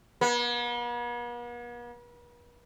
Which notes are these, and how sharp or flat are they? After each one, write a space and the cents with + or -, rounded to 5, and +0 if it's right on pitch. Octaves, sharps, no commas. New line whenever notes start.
B3 -45